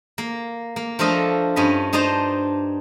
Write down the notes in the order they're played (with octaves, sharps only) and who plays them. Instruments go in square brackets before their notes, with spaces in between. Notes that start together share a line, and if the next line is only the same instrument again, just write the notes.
[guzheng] A#3
A#3
F3 A3 D4 F4 A4 D#5
G2 C#4 D#5 B5
D4 D#4 C5 D#5 A5 A#5